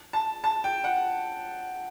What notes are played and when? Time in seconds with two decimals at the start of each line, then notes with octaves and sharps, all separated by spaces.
0.13 A5
0.44 A5
0.64 G5
0.84 F#5